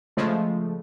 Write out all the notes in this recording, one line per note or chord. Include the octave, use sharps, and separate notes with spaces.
C#3 F3 G#3 A3